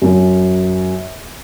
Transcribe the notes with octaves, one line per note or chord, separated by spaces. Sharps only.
F#2